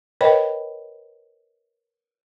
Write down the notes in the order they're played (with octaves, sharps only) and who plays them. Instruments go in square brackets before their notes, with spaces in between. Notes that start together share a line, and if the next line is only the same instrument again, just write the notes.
[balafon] A#4 B4 C#5 D#5 G5 B5